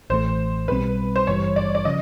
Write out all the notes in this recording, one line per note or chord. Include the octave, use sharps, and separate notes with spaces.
A1 A2 E3 A3 C5
B1 B2 G3 C4 B4
C5
G#1 G2 E3 G3 C#5
D5
D5
C#3 F3 D#5